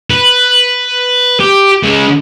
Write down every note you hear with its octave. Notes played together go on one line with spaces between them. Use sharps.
B4
G4
C#3 G#3